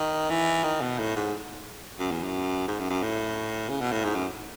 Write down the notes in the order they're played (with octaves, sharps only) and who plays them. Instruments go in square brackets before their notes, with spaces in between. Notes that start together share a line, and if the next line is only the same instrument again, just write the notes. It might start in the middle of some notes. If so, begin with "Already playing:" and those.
Already playing: [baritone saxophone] D#3
E3
D#3
B2
A2
G#2
F#2
E2
F#2
G#2
F#2
F#2
A2
C#3
B2
A2
G#2
F#2